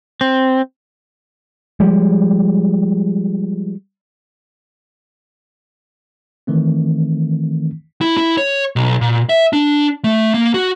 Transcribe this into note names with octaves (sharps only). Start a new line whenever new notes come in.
C4
F3 G3 G#3
D#3 E3 A3 C4
E4
E4
C#5
B1
A#2
E5
D4
A3
A#3
F#4